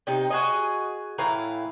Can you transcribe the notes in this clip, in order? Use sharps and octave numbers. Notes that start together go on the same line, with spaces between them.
C3 D#4
F#4 G#4 D#5
A2 E3 F5 A#5